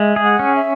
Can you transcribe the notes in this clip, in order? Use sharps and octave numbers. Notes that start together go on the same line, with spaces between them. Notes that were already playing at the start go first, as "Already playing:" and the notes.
Already playing: G#3 E5
G#4
F#5
C#4
E5